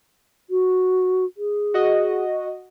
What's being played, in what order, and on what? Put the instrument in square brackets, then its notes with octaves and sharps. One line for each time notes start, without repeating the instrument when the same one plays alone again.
[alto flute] F#4
G#4
[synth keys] F#4 D#5